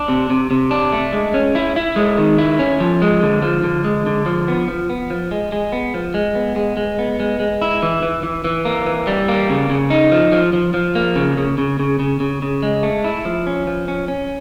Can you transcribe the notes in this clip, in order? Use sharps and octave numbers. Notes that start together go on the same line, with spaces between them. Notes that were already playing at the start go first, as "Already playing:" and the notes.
Already playing: D4
C3
C3
C3
D4
A3
G#3
C#4
E4
E4
G#3
D#3
E4
C#4
F3
G#3
D3
F3
D3
G#3
D3
F3
B3
F3
B3
F3
G#3
G#3
B3
F3
G#3
B3
G#3
G#3
B3
G#3
G#3
E4
E3
E3
E3
E3
A#3
E3
G3
A#3
C#3
C#3
D#4
F3
F3
F3
F3
A#3
C#3
C#3
C#3
C#3
C#3
C#3
C#3
G#3
A3
E4
F3
C#4
F3
C#4
C#4